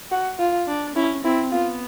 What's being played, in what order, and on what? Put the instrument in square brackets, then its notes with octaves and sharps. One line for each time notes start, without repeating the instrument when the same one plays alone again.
[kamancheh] F#4
F4
[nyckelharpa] D4
[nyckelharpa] C#4 [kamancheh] E4
[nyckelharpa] C4 [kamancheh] E4
[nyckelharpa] B3 [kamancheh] F4